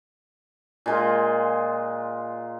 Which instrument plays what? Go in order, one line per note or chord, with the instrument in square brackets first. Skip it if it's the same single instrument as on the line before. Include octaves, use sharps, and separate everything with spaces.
[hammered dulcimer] A#2 G#3 F4